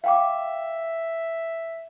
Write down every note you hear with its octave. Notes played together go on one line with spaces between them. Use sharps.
E5 F5 G5 D6